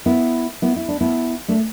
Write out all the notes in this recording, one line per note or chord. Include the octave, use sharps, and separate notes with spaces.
B3 E4
B3 E4
E4
D4
B3 E4
A3 D4